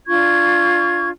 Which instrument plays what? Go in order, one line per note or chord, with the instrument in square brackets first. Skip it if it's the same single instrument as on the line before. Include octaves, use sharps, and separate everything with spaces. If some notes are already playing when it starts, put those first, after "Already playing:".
[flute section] D4 F4 C#6 G#6